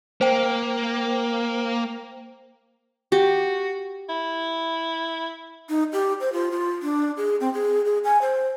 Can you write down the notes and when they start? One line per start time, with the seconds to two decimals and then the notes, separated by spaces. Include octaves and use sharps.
0.21 A#3 C5 G5
3.12 F#4 G4
4.09 E4
5.69 D#4
5.93 G4
6.20 C5
6.33 F4
6.51 F4
6.82 D4
7.17 G#4
7.40 C4
7.54 G#4
7.85 G#4
8.05 G#5
8.22 C5